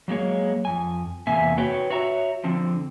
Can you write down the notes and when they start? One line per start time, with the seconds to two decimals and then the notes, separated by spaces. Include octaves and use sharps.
0.08 F#3 G#3 A#3 C#5
0.65 F2 G#5
1.27 E2 C3 A#3 E5 G#5
1.58 F#4 B4 C#5 G5
1.90 F#4 C#5 E5 A#5
2.44 D3 F3 C4